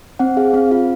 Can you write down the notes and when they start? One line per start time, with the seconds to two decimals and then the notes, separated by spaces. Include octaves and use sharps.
0.19 C4 F#5
0.37 G#4 F5
0.54 C4 F5
0.71 F4 F5